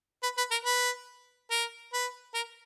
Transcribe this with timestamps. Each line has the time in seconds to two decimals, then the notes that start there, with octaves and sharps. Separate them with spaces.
0.23 B4
0.38 B4
0.51 A#4
0.65 B4
1.51 A#4
1.93 B4
2.34 A#4